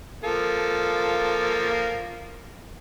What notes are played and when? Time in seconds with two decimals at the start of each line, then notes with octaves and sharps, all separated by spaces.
0.24 F3 A#3 A4